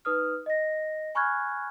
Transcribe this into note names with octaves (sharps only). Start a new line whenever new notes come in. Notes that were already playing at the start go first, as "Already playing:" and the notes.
D#4 B4 D#6 F6
D#5 A#6
G#5 B5 C#6 F6 F#6 G#6